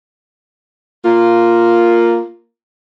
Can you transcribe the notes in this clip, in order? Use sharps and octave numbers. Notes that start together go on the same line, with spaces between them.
A#3 F4